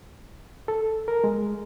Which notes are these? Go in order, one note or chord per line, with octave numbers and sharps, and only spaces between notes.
A4
A#4
G#3